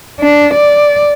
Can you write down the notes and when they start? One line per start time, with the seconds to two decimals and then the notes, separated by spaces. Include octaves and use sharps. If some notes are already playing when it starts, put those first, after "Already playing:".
0.21 D4
0.54 D5